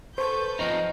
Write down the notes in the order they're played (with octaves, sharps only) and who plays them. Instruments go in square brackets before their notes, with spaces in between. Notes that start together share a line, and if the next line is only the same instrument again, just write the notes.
[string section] A4 B4 G6 [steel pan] C5 [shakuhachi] C#6
[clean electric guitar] F3 C4 D#4 [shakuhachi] D#5